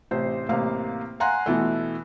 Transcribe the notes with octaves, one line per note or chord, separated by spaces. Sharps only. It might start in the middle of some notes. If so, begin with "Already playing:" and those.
A1 C3 C5
A1 C3 A#3 F5
F5 F#5 G#5 A#5 C6 F#6
B2 E3 A3